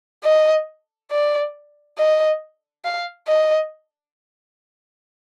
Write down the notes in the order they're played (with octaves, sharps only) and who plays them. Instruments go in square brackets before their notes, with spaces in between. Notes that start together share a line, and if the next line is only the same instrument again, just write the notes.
[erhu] D#5
D5
D#5
F5
D#5